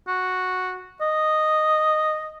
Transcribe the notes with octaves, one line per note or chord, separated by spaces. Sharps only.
F#4
D#5